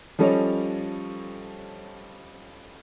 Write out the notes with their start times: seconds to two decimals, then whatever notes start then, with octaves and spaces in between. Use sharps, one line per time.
0.19 F3 G3 C#4 A4 C#5 D#5